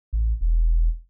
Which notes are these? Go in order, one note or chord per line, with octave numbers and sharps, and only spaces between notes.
A1
E1